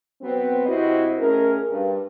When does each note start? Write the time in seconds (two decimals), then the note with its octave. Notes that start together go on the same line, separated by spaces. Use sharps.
0.21 F#3 B3 C4
0.66 C3 E4 F#4 C5 D#5
1.18 A2 C#4 G#4 A#4
1.70 G2